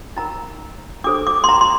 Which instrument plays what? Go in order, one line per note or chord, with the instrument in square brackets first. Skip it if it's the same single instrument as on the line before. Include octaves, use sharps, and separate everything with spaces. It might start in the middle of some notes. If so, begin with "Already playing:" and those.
[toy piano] D#4 A#4 A#5
D4 A4 C5 D6
D6
C6
A#5
C6